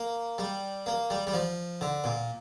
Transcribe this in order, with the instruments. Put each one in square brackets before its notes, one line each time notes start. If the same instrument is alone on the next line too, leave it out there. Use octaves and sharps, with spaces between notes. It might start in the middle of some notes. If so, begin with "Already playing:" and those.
Already playing: [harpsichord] A#3
G3
A#3
G3
G3
F3
D3
A#2